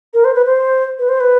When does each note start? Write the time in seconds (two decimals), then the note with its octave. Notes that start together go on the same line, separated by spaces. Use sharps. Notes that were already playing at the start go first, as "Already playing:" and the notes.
0.14 A#4
0.24 C5
0.35 B4
0.46 C5
0.99 B4
1.09 C5
1.20 B4